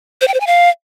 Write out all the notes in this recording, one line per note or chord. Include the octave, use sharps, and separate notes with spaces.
C5
G5
C5
G#5
F5